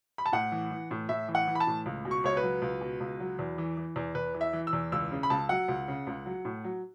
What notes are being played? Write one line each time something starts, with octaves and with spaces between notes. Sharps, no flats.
B5
A5
A2 F#5
E3
E3
A2
A2 E5
E3
F#5
E3
B5
A5
A2
C#2
B2
C#6
C#2 C#5
B4
F#3
C#2
B2
C#2
F#3
E2
E3
E3
E2
E2 B4
E3
E5
E3
E6
E2
C#2 E6
C#3
B5
C#2 A5
F#3 F#5
C#2
C#3
C#2
F#3
A2
F#3